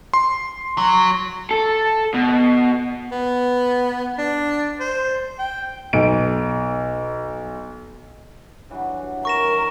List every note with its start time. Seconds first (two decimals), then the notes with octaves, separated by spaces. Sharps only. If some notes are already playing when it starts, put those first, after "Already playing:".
0.14 C6
0.78 F#3
1.51 A4
2.14 B2
3.12 B3
4.18 D4
4.80 C5
5.39 G5
5.93 B1 D7
8.70 G2 E3 F#3
9.25 A#4 C#6 A#6 E7